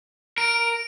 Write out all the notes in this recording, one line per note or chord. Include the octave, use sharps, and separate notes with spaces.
A#4 D7